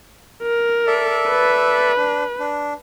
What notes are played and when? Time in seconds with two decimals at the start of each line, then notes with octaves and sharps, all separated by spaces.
0.43 A#4
0.87 A4 D5 E5
1.29 B4
1.98 D4
2.40 D4